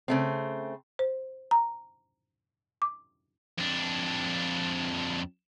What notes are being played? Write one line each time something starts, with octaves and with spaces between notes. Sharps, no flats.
C#3 A3 C4
C5
A#5
D6
F2 D4